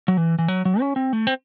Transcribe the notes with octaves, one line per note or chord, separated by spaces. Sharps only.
F#3
E3
E3
F#3
F#3
C#4
C4
A3
C4